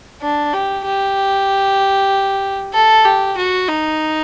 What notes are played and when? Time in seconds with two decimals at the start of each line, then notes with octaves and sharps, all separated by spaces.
0.21 D4
0.53 G4
0.85 G4
2.74 A4
3.05 G4
3.37 F#4
3.68 D#4